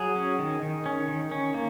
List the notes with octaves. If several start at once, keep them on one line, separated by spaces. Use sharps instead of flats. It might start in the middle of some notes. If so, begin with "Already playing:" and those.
Already playing: F#3 G#4
C#4
D#3
D#3
C#4
D#3
C#4
A#3